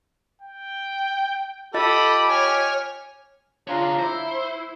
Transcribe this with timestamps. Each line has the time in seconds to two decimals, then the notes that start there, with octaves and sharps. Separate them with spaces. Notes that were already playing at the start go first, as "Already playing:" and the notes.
0.42 G5
1.74 F4 G4 A4 D#5 B5 D#6 A6
2.30 C#5 G#5 F6
3.68 D4 F4 C#5 F5 A#5
3.99 E4 C5